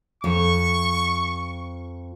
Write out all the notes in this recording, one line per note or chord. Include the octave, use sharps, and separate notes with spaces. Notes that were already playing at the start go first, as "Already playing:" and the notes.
F2 C#6